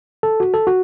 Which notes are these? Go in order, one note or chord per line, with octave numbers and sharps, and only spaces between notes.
A4
F#4
A4
F#4